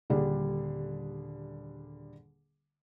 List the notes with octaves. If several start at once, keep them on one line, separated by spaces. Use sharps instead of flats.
D#1 D3 G3 D4 G#4